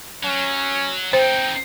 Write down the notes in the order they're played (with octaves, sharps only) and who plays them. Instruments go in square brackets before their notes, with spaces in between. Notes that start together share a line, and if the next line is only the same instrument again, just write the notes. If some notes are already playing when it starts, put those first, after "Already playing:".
[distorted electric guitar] F#3 [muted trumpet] C#4
[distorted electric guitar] C4 D#4 [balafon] C5 [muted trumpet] G5